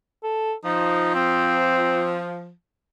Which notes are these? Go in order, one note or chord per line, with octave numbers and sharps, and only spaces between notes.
A4
F3 D#4
C4